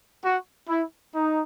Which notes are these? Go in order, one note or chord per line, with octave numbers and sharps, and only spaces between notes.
F#4
E4
D#4